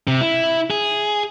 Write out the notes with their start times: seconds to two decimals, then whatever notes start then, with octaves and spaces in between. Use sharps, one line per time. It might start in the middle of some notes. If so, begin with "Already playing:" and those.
0.07 C3
0.21 E4
0.70 G#4